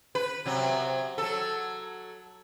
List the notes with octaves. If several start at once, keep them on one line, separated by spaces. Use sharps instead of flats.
B4
C3 F#3
F#3 A4